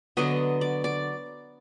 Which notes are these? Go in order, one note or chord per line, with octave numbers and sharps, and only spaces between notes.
D3 F#3 B3 D#5
D5
D5